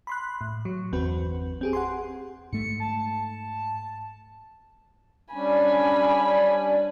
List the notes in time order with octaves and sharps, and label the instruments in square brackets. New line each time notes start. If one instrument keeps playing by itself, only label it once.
[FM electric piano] B5 C6 F#6
A2
F#3
G1 E2 C4 F#4 B4
C4 G4 G#4
F#5 G#5 C6
[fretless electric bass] G#2 A3 [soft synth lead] C#7
[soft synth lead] A5
[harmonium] G3 C#4 D4 [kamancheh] G#5 B5